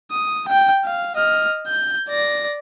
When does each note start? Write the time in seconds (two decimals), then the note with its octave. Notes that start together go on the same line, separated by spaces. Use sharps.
0.12 D#6
0.48 G5
0.86 F5
1.17 D#5 F6
1.68 G6
2.09 D5 A#6